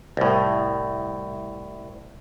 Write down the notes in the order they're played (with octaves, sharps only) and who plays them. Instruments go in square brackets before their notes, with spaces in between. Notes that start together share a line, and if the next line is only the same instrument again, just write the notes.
[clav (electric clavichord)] C2 A2